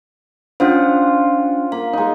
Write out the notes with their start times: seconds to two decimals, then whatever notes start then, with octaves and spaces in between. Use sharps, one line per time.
0.60 C#4 D4 F4 C5 F#5
1.72 A#3 F5
1.93 G#3 D#4